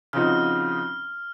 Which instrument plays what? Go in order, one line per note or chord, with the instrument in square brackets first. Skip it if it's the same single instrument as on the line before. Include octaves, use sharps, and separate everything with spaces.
[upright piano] C#3 F3 C4 D#4 F#4 [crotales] F6